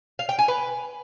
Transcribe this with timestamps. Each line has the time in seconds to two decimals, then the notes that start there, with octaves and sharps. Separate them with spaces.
0.19 F5
0.29 G5
0.39 G#5
0.48 B4